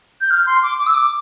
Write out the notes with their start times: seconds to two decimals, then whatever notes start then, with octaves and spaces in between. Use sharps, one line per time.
0.21 G6
0.31 F6
0.46 C6
0.63 D6
0.79 D6
0.87 E6
0.94 D6